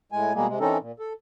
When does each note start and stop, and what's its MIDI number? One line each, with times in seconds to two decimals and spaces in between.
0.12 0.33 45
0.12 0.33 56
0.12 0.33 80
0.34 0.47 47
0.34 0.47 55
0.34 0.47 56
0.34 0.47 58
0.34 0.47 68
0.48 0.59 48
0.48 0.59 56
0.60 0.78 52
0.60 0.78 60
0.60 0.78 61
0.60 0.78 63
0.60 0.78 69
0.60 0.78 70
0.81 0.92 46
0.99 1.13 69